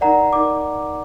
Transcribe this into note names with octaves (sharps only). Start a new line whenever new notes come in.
D#4 A#4 D5 F#5 A#5
D#4 A#4 D5 D6